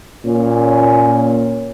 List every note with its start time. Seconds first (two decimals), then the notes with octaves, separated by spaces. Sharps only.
0.24 A#2 C#4